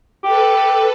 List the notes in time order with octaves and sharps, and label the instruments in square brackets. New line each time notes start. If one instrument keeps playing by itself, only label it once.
[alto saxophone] G4 [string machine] A4 B4